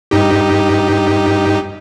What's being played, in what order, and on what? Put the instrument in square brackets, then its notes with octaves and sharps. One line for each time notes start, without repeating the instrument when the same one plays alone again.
[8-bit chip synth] G2 D#4 G4